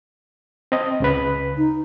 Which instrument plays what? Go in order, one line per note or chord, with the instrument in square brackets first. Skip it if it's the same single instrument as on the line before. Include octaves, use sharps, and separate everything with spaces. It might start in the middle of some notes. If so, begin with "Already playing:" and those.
[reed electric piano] C4 D#5
C#2 C#3 B4
[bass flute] D#4